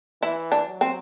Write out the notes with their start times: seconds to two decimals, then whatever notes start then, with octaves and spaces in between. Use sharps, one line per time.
0.22 E3 E4
0.52 D4
0.67 F#3
0.81 C4